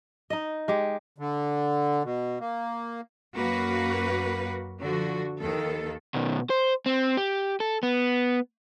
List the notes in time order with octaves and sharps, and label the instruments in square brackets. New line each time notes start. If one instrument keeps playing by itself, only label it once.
[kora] D#4 D#5
G#3 G4
[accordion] D3
B2
A#3
[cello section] F#2 A#3 F#4 B4
D3 F3 F#4
D#2 D#3 A4
[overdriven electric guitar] B2 D#3
C5
C4
G4
A4
B3